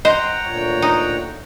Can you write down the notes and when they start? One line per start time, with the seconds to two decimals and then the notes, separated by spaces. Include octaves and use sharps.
0.05 C5 D#5 F#5 G5 A#5
0.44 D2 A#2 C#5
0.82 D#4